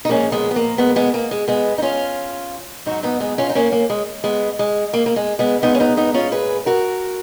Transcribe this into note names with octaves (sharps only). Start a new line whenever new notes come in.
D#4
A#2 F3 G#3 A#3 C#4
G#3 B3
B3
A#3
G#3 B3
G#3 B3
A#3
G#3
G#3 B3
D#4
C#4 F4
G#2 F#3 D#4 F#4
B3 D#4
G#3 B3
C#4 F4
D#4
A#3 C#4
A#3
G#3
G#3 B3
G#3
A#3
A#3
G#3
G#3 B3
A#2 G#3 B3 D#4
C#4
B3 D#4
B3 D#4
C#4 F4
G#4 B4
F#4 A#4